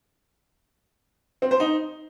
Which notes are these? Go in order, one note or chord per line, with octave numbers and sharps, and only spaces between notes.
C4
C5
D#4